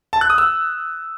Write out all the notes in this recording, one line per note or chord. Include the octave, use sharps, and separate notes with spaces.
A5
F#6
D#6
E6